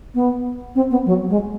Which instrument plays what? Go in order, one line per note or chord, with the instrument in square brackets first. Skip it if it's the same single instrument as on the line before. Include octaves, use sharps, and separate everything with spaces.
[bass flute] B3
C4
B3
F#3
G#3